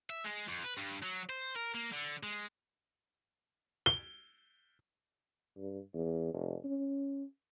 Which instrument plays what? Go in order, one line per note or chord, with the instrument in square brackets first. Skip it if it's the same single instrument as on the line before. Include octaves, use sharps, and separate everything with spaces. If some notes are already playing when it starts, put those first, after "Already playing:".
[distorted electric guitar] E5
G#3
F2
B4
G2
F#3
C5
A#4
A#3
D3
G#3
[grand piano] G7
[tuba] G2
E2
F1
C#4